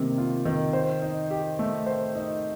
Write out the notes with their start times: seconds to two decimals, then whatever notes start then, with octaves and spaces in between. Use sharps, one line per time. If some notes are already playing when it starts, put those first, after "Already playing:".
Already playing: C3 D#3 A#3
0.18 F4
0.45 D#3
0.73 C5
1.02 D#4
1.31 G4
1.59 A3
1.86 C5
2.15 D#4